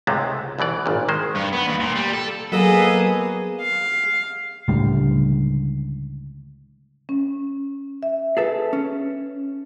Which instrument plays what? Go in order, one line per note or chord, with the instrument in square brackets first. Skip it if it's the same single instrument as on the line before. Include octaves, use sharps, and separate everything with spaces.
[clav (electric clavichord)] C#2 G#2 C3 G#3 A3
C2 B2 E3 D5
G#1 A#2
D#3 G#3 C5
[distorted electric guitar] G2
B3
D#2
A#2
G3
A4
[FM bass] F#3 [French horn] A#3 [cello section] B3 G#4 [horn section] A4 B4 D#5
[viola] F5
[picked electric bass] C#2 A2 D3 G3
[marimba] C#4
E5
[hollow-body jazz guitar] G#4 A4 E5 [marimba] B4
[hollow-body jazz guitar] C#4